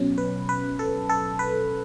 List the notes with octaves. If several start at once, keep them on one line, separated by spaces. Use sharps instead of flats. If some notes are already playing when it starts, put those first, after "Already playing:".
Already playing: B2 F#3 C#4
B4
B4
A4
A4
B4